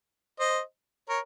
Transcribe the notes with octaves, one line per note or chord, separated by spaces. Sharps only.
C5 D#5
A#4 C#5